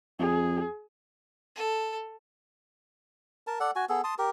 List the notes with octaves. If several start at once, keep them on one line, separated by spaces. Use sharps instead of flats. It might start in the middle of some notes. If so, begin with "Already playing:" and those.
F2 G#4
A4
A#4 A5
A4 D5 F#5
F#4 G#5
B3 G#4 A4
A5 C6 D#6
G4 A#4